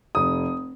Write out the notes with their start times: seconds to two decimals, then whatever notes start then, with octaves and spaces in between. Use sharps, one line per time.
0.15 F1 D#6